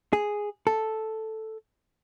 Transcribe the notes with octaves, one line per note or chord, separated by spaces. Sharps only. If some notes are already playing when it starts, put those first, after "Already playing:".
G#4
A4